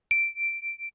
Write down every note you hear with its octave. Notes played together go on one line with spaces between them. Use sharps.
D7